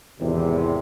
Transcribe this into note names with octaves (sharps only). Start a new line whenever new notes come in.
G#1 E2 C3